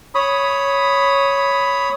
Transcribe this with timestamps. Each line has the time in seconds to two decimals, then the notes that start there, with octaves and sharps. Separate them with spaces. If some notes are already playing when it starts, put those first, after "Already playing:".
0.15 C#5 B5 D#6